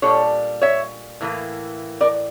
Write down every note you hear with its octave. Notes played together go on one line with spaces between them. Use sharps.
A#2 G3 D4 A4 C#5
C#5 E5
A2 E3 A#3
A#4 D5